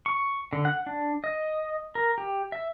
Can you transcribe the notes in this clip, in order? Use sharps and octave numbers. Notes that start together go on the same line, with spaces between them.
C#6
D3
F#5
D4
D#5
A#4
G4
E5